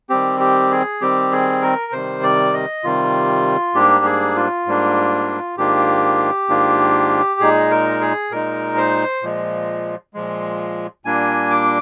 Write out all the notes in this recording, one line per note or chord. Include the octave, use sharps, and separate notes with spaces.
D#3 G3 C4 G4
G4
G#4
D#3 G3 C4 G4
G#4
A#4
C3 D#3 G3 C5
D5
D#5
C3 D#3 G3 F4
G#2 G3 A#3 D4 G4
G#4
F4
G#2 G3 A#3 D4
G#2 D#3 A#3 D4 F4 G4
G#2 D#3 A#3 D4 F4
A#2 G#3 D#4 G#4
A#4
G#4
A#2 G#3 D#4 A#4
C5
A#2 F3 G#3
A#2 F3 G#3
A#2 G3 A#3 D4 G#5
D6